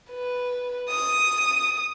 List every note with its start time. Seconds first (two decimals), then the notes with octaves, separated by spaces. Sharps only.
0.11 B4
0.90 D#6